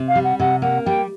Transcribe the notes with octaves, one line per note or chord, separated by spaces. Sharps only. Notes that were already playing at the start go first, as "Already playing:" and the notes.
Already playing: C3
F5
G3
F#5
C3 F#5
A#3 F#5
G3 G5